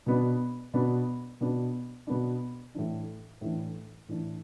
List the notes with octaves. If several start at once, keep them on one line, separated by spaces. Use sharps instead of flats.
B2 B3 D4
B2 B3 D4
B2 B3 D4
B2 B3 D4
A2 E3 D4
A2 E3 D4
A2 E3 D4